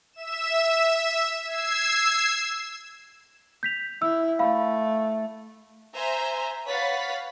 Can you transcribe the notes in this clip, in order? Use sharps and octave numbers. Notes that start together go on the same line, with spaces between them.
E5 E7
E6 G#6 C7 E7
G6 B6 F7
E4 E6
A3 F5 B5
C5 E5 G#5 A#5
B4 C#5 F5 F#5 A6 B6